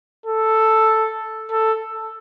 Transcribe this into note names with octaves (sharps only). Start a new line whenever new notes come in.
A4
A4